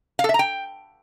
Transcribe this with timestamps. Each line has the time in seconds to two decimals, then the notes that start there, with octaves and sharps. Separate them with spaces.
0.19 F5
0.24 A4
0.29 E5
0.34 A#5
0.39 G5